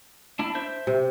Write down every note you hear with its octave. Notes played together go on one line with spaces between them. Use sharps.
D4 E4
C5 E5 G6
C3